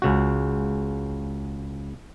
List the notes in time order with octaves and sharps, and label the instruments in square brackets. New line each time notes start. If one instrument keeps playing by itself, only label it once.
[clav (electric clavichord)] C#2 C#3 F#4